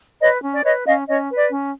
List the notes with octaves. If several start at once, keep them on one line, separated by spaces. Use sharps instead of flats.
B4 C#5 D#5
C#4
D5
B4 C#5 D#5
C#4 D#5 F5
C#4 C#5 D#5
B4
D5
C#4